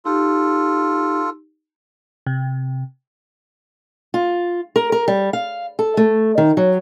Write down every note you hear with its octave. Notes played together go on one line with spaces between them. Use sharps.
D#4 F4 G4 A4
C3
F4
A#4
A#4
G3
F5
A4
A3
D#3
F#3